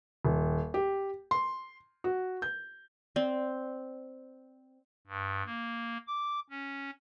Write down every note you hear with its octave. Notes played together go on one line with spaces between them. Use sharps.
D#1
G4
C6
F#4
G6
C4 D5
G2
A#3
D6
C#4